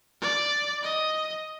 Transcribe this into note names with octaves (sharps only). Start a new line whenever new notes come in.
D5
D#5